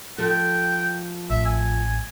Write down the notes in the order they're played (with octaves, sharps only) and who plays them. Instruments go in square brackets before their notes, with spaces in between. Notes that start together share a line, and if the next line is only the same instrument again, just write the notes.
[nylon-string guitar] F3 A4 [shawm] G5
[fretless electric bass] A1 [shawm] E5
[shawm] G#5